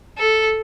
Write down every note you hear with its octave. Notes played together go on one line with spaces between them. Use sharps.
A4